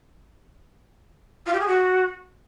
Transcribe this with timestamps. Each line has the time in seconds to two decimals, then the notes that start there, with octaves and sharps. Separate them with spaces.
1.46 F4
1.53 G4
1.60 G#4
1.67 F#4